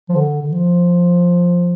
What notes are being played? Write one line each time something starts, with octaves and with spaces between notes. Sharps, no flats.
F3
D3
D3
F3